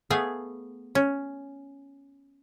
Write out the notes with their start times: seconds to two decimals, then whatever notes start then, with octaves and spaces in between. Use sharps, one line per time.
0.10 A3 B3 G#4 F5 G#5
0.95 C#4